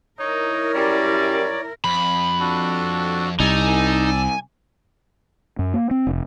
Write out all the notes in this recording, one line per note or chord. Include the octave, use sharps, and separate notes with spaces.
D#4 E4 A#4 C#5
F#2 G3 D5
F2 B5
D4 F#4 A4
C2 D#4 D5 G#5 A5 E6
F#2
A#3
C4
F1